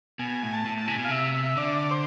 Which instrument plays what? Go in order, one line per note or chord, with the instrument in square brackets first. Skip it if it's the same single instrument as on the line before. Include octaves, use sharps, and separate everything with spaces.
[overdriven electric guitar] B2 [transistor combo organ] G#5
[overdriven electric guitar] A2
[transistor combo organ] A5
[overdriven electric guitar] A2
[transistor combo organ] A5
[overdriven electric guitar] C3 [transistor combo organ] G#5
[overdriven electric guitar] B2
[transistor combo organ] F5
[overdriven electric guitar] C3 [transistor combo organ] E5
[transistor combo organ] E5
[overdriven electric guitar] D3 [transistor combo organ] D5
[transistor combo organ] C5